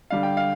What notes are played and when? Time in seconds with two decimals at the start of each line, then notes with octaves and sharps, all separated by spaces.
0.10 D3 G3 D4 F5
0.23 G5
0.37 F5